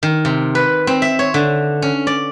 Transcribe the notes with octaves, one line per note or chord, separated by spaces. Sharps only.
D#3
C3
B4
C4
E5
C#5
D3
C#4
D5